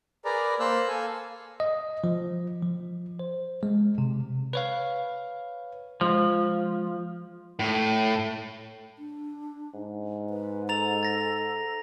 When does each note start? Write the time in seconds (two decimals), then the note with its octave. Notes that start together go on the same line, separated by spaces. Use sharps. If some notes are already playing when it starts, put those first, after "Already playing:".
0.25 G#4 A#4 B4 D5 A#5
0.60 A#3 C5 E6 F#6
0.88 A4 F5 G#5
1.60 D#5
2.04 F3
2.62 F3
3.19 C5
3.63 G#3
3.98 C3
4.53 B4 C#5 F5
6.01 F3 G#3
7.59 A2
8.98 D4
9.75 G#2
10.30 B4
10.69 A4 A#5 A6 F7
11.03 A6 A#6